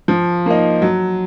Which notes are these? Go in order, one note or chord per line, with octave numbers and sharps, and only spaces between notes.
F3
A#3 D#4
F#3